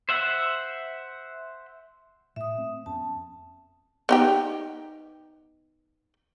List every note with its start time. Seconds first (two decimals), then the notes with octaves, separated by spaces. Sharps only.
0.09 C5 E5 F#5
2.36 A2 E5 D#6
2.58 A3 C4
2.86 F2 B3 C#4 A5
4.09 B3 D#4 G4